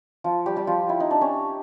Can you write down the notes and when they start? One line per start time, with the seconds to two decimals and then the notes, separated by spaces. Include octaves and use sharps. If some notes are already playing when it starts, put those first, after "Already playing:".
0.24 F3 F4
0.46 G3 G4
0.56 G3 G4
0.67 F3 F4
0.89 E4
1.00 D#4
1.11 D4
1.21 C#4